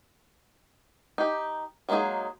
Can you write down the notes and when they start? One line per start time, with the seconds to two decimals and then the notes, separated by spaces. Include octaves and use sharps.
1.18 D#4 G4
1.89 F#3 G#3 A#3 D#4 G#4